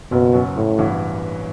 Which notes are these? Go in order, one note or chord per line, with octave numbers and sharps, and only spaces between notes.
F#1 B2
F#2 F#3 B3 F#4
A1 A2
G2 E3 B3 F#4